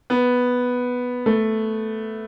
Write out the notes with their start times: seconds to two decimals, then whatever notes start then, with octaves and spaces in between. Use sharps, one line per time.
0.10 B3
1.26 A3